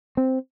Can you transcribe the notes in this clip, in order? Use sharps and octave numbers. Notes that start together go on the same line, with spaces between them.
C4